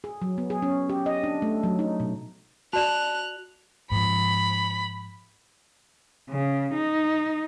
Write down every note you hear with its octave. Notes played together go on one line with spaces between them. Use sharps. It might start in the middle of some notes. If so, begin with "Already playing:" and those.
G#4
F#3
B3
G#4
C#4
G4
D#5
D4
A3
F#3
D#4
B2
F#4 D5 A5 F#6 E7 F7
G#2 F3 B5
C#3
D#4